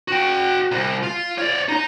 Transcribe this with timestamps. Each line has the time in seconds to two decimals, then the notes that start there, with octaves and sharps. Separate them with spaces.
0.08 F#4 G5
0.72 C2
1.03 F4
1.38 C#5 D5
1.69 D#4 A#5